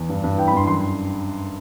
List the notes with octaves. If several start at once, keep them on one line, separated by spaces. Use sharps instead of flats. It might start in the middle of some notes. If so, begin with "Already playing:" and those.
Already playing: E2
G2
G2
E3 G5
B5
G2 C6
F#2 C6